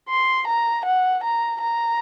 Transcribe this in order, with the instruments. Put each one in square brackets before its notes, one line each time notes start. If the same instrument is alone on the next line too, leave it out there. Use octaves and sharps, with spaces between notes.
[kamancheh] C6
A#5
F#5
A#5
A#5